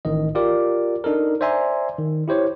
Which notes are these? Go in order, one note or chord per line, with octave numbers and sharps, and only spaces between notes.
A1 A2 D#3 D#5
F4 G4 A#4 D5 D6
D4 D#4 A4 A#4
C5 D5 E5 G#5 A#5 C6
D#3
E4 G4 C5 C#5